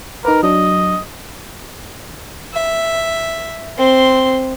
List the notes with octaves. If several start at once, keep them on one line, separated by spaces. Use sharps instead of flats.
D#4 A#4 B4
F#3 D4 D#5
E5
C4 C6